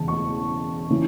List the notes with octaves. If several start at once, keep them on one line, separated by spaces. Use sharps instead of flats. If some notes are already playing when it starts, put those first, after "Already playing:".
Already playing: E1 E2 C#3 A5
C#6
C#3 E3